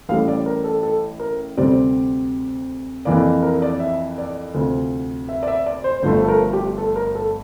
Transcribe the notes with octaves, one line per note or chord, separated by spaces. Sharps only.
A1 A2 G3 F5
D5
A#4
A4
A4
A#4
D2 C3 G3 C4 D5
F2 E3 A#3 D5
A#4
D5
E5
D5
D2 C3 F3
E5
D5
E5
D5
C5
G1 G2 F3 A3 C5
A4
A#4
G4
A4
A#4
A4